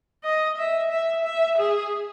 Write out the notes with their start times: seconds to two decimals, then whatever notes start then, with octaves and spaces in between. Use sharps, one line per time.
0.24 D#5
0.57 E5
0.90 E5
1.25 E5
1.58 G#4